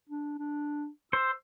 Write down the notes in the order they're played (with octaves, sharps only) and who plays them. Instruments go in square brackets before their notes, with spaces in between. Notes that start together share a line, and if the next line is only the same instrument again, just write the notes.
[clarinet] D4
D4
[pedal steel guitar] C5 [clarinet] E6